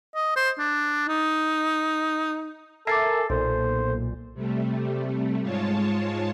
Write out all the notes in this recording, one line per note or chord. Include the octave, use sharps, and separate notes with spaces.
D#5
C5
D4
D#4
A4 A#4 E5 G#5 D6 A6 C7
B1 A#2 A4 C5
C3 G3 A3
G#2 G#3 F4 C#5 A5